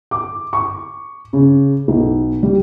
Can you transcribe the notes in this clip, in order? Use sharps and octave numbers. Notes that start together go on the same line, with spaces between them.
D6
C#6
C#3
B1
G3